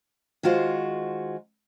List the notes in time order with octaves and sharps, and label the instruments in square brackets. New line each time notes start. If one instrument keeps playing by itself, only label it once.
[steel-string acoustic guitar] D#3 G#3 F4 F#4 C5